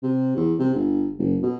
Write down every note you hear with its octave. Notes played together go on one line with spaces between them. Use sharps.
C3
E2
C3
G1
F#1
B2